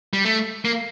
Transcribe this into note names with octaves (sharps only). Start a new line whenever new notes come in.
G3
A3
A#3